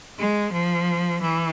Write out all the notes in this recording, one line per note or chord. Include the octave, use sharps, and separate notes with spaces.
G#3
F3
E3